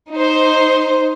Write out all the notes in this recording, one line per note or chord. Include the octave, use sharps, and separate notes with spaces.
D#4 C5